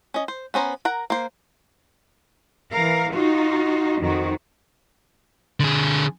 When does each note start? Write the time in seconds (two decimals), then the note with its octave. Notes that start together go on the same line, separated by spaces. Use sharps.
0.14 C#4 D#5
0.28 C5
0.54 B3 C#4 C5 A#5
0.85 A#4 F#5 A#5
1.10 A#3 C5
2.74 E3 A#4 F5
3.14 D#4 F4 F#4
4.01 F2 D#3 D#4 F#4
5.60 D3 G#4